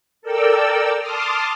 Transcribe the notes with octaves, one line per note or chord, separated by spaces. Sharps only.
A4 A#4 D5 G5 E6
A5 C6 D6 D#6 F6